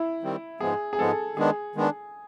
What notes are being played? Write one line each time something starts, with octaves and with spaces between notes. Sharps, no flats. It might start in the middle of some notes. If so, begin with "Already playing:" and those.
Already playing: E4
D#3 G3 C4
G#2 F3 G#3 B3 G#4
G#4
G#2 F3 G#3 B3 A4
D#3 G#3 B3 D4 G#4
D#3 G#3 B3 D4